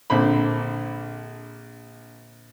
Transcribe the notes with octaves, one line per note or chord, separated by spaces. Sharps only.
A#1 D3 C4 C5 B5